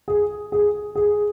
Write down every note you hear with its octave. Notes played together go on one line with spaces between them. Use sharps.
G#4
G#4
G#4